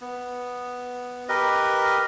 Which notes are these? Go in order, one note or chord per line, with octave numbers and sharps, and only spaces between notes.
B3
G4 A#4 B4 D#5